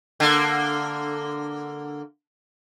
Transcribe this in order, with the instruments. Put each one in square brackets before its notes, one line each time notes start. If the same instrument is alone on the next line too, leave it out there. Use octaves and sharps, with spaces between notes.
[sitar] D3 A#3